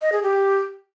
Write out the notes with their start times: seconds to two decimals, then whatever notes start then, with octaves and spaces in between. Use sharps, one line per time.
0.02 D#5
0.12 G#4
0.23 G4